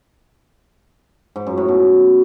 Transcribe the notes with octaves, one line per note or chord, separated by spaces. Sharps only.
G#2
F#2
A2
B2